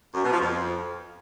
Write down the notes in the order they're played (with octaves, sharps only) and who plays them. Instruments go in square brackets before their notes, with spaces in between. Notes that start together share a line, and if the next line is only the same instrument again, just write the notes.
[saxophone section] F#2
B2
F3
F2